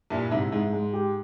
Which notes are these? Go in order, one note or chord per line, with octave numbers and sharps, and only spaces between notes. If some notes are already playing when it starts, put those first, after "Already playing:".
G2 A#2 E4
G#2 C3 E4
G#2 G#3
G#3
G4